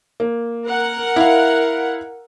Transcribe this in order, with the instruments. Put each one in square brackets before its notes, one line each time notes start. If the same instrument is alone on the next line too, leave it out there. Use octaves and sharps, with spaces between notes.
[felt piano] A#3
[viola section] A#4 F#5
[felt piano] E4 F5